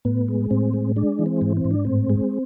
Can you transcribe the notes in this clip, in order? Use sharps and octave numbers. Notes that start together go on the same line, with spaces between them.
A2 B3
G#3
A2 C4
G#3
G#3 D4
E3
C4
G#2
C4
G#2
D4
A2 C4
G#3